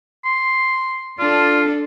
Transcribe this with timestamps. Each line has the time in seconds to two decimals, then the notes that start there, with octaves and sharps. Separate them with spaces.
0.25 C6
1.19 D4 F4 A4